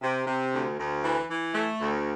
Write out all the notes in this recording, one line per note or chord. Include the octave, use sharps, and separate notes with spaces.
C3
C3
D2
D2
E3
E3
A3
D2